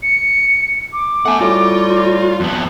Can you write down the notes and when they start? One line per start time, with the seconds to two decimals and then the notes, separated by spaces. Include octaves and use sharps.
0.03 C#7
0.93 D6
1.26 A3 B3 F#5 G#5
1.41 A2 G3 F4 F#4
2.40 F2 B3